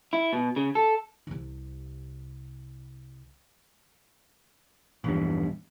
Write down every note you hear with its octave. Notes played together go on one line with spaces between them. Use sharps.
E4
B2
C#3
A4
C2 C3
A#1 E2 G2